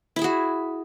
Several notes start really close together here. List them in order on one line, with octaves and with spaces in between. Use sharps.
E4 E5 G#4 F#4